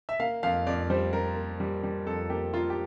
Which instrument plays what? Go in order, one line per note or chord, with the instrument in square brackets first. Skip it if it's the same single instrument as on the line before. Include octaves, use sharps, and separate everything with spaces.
[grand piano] E5
A#3 F5
F2 F5
F2 D5
G3 C5
G3 A#4
A#3
G3
G3
F2 A4
A#3 G4
A#3 F4
G4